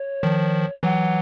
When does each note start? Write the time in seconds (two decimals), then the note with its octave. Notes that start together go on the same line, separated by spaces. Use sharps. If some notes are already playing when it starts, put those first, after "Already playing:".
Already playing: C#5
0.23 D#3 F3
0.83 E3 F#3 F#5